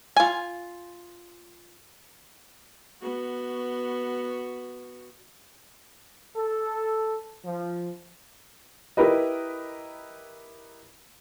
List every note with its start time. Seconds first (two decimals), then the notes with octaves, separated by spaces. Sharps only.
0.17 F4 G#5
3.02 B3 F#4
6.36 A4
7.44 F3
8.97 E4 G4 A#4 B4 D#5